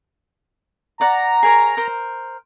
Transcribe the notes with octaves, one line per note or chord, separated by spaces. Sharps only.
D5 F#5 A#5
G#4 A#4 C#5
A#4 C5